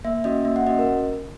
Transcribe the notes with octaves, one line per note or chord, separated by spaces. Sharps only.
A#3 E5
C#4 F#4 D#5
A#3 E5
F#5
C#4 F#4 D#5
A#4